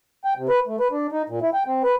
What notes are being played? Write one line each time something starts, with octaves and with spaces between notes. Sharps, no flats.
G5
C3
B4
A3
B4
D4
D#4
A#2
E4
G5
C4
B4